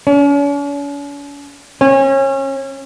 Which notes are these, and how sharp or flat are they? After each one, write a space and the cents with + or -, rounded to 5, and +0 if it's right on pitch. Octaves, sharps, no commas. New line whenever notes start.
C#4 +45
C#4 -30